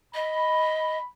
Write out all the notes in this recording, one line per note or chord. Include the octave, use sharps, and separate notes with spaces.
D#5 B5